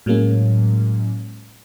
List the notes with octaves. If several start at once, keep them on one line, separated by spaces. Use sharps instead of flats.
A2 F#3 G#3 A#3 C#4